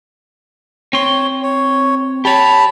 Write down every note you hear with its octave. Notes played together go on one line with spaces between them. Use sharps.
C4 C#5 C6
C#5
G4 C#5 A5 B5